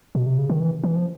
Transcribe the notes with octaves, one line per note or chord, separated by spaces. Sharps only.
B2
C3
C#3
D#3
E3
E3
F3